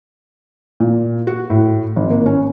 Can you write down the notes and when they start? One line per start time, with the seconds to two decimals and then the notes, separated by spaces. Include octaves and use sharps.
0.80 A#2
1.27 F#4
1.50 A2
1.96 G#1
2.10 A#3
2.26 C#4